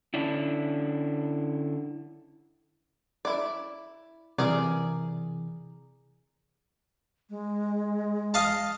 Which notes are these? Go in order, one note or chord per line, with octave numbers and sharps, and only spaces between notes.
D3 C#4 D4 E4
E4 D5
C3 E3 G#4 A#4 D5
G#3
D#5 F5 A5